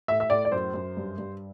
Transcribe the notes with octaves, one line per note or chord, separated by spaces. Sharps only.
A2 E5
E5
A2 D5
D5
F#2 C5
F#2
G2
G2